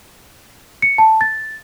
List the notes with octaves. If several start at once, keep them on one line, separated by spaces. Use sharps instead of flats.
C#7
A5
A6